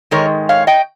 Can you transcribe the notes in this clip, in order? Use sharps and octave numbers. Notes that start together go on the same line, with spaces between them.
G#2 D#3 G#3 A#4 C#5
C#5 F5
D#5 G5